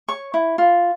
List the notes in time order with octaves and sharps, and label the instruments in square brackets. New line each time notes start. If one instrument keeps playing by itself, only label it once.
[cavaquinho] C#5 C#6
E4
F4